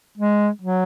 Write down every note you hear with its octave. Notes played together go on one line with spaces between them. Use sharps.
G#3
F#3